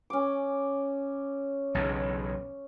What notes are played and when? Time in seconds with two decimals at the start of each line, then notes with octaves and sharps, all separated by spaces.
0.10 C#4 D6
1.75 B1 E2 C#3